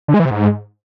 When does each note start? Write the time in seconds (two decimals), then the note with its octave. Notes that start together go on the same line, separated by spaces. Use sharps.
0.08 D3
0.14 G#3
0.20 E3
0.25 C3
0.31 G#2